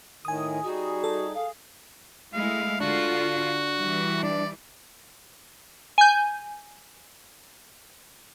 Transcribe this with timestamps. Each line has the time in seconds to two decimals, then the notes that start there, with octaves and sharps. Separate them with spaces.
0.25 A2 D#3 G#5 D#6
0.63 G3 D#4 F#4 G#4
1.04 A4
1.34 G#4 F5
2.33 G#3 A3 E4 F5
2.80 D3 D4 F4 F#4
3.78 E3 G3
4.23 D4 D5
5.98 G#5 G6